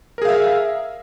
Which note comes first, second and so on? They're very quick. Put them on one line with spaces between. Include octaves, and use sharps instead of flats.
A#4 G#4 F5 E5